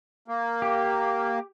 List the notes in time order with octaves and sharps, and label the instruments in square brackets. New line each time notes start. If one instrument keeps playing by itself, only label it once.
[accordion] A#3
[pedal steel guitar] G4